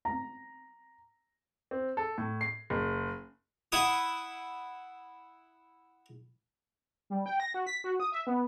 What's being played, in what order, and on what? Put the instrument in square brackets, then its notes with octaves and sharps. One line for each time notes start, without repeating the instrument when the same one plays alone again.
[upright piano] A#5
C4
A4
A2
C7
F#1
[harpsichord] E4 F#5 D#6
[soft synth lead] G3
G5
A#6
F#4
B6
F#4
D#6
E5
B3